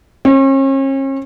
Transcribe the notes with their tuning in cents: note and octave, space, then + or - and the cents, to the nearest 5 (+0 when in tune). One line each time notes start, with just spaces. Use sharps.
C#4 -40